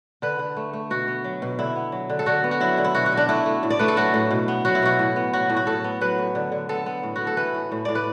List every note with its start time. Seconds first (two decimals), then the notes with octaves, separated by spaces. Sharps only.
0.22 D3 B4
0.39 D3
0.57 A3
0.73 A3
0.90 B2 F#4
1.08 B3
1.24 F#3
1.42 B2
1.59 D3 E4
1.76 B3
1.92 F#3
2.10 D3
2.19 A4
2.26 D3 F#4
2.44 B3
2.51 F#4
2.60 F#3 E4
2.78 D3
2.84 E4
2.95 B2 F#4
3.06 F#4
3.12 B2
3.17 D4
3.29 A3 E4
3.46 A3
3.63 A2
3.70 D5
3.79 A3 B4
3.88 A4
3.97 F#3 F#4
4.14 A2
4.31 B2
4.48 B3
4.65 F#3 F#4
4.75 E4
4.83 B2 F#4
4.99 A2
5.16 B3
5.33 F#3 F#4
5.50 A2
5.57 F#4
5.67 A2 A4
5.84 B3
6.01 F#3 B4
6.19 A2
6.35 D3
6.52 D3
6.69 B3 A4
6.86 B3
7.03 A2
7.16 B3 F#4
7.27 A4
7.37 E3 B4
7.54 A2
7.72 A2
7.85 A2 D5
7.95 B4